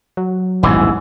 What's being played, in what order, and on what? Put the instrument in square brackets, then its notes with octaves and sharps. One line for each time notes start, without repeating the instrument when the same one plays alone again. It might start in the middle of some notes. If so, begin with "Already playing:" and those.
[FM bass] F#3
[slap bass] D#1 A1 [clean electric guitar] E2 G#2 E3